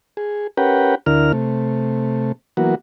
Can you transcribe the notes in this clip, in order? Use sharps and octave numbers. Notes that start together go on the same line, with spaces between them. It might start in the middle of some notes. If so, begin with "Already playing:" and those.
G#4
C#4 G4 A#4 B4 F#5 G5
D2 D3 E4 A#4 F6
C3 A3
E3 F#3 A#3 B3 F#4